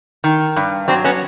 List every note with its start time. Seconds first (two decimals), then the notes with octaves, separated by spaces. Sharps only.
0.24 D#3
0.56 G2
0.88 F#3 C4 D4
1.04 B3 C#4